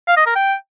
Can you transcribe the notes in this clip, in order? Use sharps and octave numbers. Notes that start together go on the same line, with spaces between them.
F5
D#5
A#4
G5